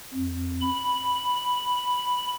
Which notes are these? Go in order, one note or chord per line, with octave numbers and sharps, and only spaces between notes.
F2
B5